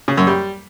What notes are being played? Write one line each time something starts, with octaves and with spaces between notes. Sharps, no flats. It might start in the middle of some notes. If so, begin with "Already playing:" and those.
C#3
F#2
G3